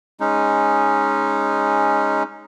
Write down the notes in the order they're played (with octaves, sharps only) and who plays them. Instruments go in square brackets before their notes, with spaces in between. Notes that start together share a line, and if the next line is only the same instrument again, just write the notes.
[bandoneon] G#3 C#4 D#4